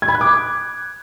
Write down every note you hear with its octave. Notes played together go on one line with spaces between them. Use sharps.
G#6
B5
F#6
D6